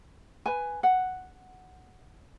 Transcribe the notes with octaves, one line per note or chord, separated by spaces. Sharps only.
B4 G#5
F#5